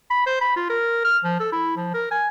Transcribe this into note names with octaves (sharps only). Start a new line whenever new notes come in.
B5
C5
B5
F4
A#4
F6
F3
A4
E4
F3
A#4
G#5